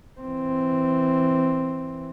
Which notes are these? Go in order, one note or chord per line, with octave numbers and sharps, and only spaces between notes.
E3 C4